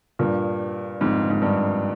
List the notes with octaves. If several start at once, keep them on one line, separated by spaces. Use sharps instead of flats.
G2 A#2
F2 G#2
G#2
G2